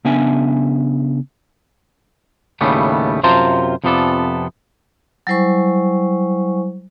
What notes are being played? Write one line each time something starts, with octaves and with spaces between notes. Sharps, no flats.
C#3 B3 D4 E5 G#5
D#2 A2 C#3 G3 A3 B3
F#2 C3 F4 C5 A5 A#5
F2 C3 F3 B3 A4 D5
F#3 G3 E4 C5 G#5 C#6